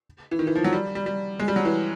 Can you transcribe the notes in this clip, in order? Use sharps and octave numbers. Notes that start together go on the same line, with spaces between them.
E3
D#3
E3
F3
F#3
G3
G3
G3
G#3
G3
F#3
E3